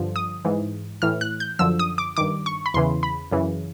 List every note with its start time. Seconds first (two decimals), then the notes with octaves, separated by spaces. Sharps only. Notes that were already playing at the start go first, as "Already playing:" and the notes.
Already playing: G2 D3 F3
0.16 D#6
0.45 G#2 E3
1.02 A2 E3 F6
1.21 F#6
1.40 G6
1.59 F#2 D3 F3 E6
1.79 D#6
1.98 D6
2.17 G2 D#3 D6
2.46 C#6
2.66 B5
2.74 E2 C#3 E3 C6
3.03 B5
3.32 F#2 C#3 E3